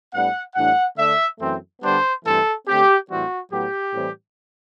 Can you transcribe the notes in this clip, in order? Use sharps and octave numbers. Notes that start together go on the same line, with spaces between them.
A2 G3 B3 D4 F#5
A2 E3 G3 D4 F#5
D3 A3 D4 E5
F#2 E3 A3 C4
D3 G3 B3 D4 C5
G2 E3 A3 C4 A4
D3 A3 C4 G4
A2 E3 G3 C4 F#4
A2 F#3 B3 G4
A2 E3 G3 C4